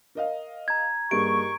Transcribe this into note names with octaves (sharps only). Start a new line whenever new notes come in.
A#4 D#5 F5
A#5 G#6
G2 D#3 A#3 G4 G#4 C#6 D7